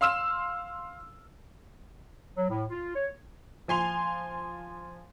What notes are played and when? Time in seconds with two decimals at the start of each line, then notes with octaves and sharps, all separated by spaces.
0.01 F5 C6 E6 F6 E7
2.36 F#3
2.50 A2
2.70 F4
2.96 C#5
3.68 F3 G#5 C6 F7